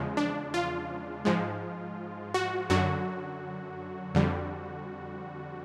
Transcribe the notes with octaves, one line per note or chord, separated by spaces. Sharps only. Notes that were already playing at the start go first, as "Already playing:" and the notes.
Already playing: E2 C#3 F3 G#3
D4
F4
G#2 F3 G#3
F#4
F#2 D3 F#3 F#4
F2 D3 G3